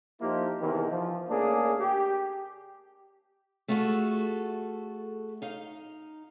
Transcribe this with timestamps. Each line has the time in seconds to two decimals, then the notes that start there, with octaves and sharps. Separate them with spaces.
0.21 F3 A#3 D#4 E4 G4
0.59 E2 C3 D#3 E3
0.90 F3
1.30 C#3 A3 A#3 D4 G#4
1.80 G4
3.68 A3 F4 F#4 G#4 A4
5.42 D#4 F5